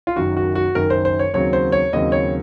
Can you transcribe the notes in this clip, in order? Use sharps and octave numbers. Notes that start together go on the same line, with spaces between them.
F4
F#1 F#2 D#3 F#4
F#4
F#4
F#1 F#2 D#3 A#4
C5
C5
C#5
D#2 C#3 F#3 C4 C#5
C5
C#5
D#2 C#3 F#3 C4 D#5
C#5